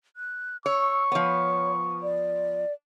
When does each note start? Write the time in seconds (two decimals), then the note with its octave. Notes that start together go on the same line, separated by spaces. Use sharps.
0.16 F#6
0.66 C#5 C#6 E6
1.12 F3 B3 C#5
2.03 D5